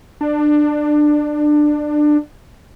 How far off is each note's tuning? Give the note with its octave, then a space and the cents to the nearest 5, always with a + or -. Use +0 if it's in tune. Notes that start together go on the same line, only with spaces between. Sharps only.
D4 +20